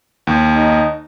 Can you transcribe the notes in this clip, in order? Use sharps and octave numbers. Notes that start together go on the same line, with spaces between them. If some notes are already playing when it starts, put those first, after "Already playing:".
D#2
D#4